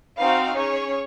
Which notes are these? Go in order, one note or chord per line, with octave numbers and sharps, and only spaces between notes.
C4 D#4 F#4 F5
C#4 G#4 C#5